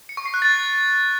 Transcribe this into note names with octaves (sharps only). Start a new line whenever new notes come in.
C#7
C#6
C7
F#6
A6